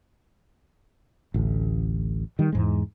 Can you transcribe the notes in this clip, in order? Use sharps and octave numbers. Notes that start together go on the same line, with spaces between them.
A1 D2
D#3 G3
E2 G#2 G#3